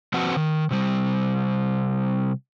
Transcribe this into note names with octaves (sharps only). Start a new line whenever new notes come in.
F3 C4 F#4 B4 F#5 A5
D#3
C3 G3